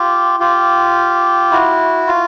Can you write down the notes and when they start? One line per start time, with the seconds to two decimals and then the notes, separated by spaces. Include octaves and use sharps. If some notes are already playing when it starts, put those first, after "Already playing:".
Already playing: F4 G4
0.40 F4 G4
1.51 E4 F#4
2.07 F4